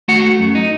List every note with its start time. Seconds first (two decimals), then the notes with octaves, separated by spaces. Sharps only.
0.08 A3 F#4 F#5
0.23 A3
0.40 F#2
0.55 D#4